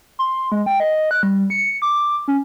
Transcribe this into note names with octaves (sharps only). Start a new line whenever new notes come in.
C6
G#3
G5
D#5
F#6
G3
C#7
D6
C#4